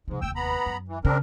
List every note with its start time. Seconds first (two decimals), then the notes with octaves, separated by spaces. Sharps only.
0.08 G#2 C3 F3
0.22 F1 D#2 G5 E6
0.36 B3 A#5 B5
0.66 F#2
0.88 E3
1.05 C#3 C4 D4 A#4